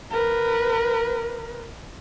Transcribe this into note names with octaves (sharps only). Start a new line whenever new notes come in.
A#4 B4